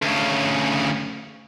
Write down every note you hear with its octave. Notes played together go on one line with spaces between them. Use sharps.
D2 C#3